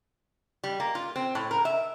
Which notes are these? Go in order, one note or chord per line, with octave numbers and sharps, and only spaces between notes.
G3
A#3
F4
C4
A2
A#4
E5